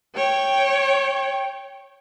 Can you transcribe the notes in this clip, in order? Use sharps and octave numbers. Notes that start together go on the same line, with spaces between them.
C#5 G5